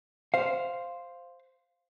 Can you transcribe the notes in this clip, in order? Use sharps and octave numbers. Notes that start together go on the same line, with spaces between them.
C5 F5